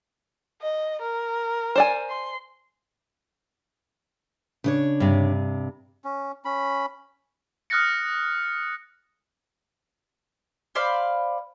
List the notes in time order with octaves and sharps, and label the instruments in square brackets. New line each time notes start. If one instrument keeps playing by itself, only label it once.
[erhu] D#5
A#4
[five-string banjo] C5 D5 G#5
[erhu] C6
[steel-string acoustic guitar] C#3 D4 C#5
[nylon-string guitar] G2 C3
[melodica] C#4
C#4 B5
[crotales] D#6 F6 F#6 A6 A#6 C#7
[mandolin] C5 D5 F5 B5